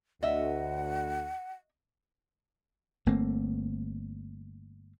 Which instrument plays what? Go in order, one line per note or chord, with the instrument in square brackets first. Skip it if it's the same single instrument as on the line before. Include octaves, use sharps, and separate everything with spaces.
[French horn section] D2 [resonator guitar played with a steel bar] D#5 E5 [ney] F#5
[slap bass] G1 A3 A#3 C4